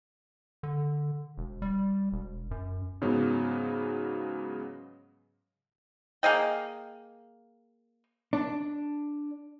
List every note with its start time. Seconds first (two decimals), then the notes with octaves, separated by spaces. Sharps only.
0.63 D3
1.38 E1
1.62 G3
2.12 E1
2.51 F#2
3.01 G#2 C#3 F#3 B3
6.23 A#3 G#4 D#5 G5
8.33 D4